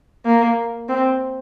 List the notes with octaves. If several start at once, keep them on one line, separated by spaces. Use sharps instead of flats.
A#3
C4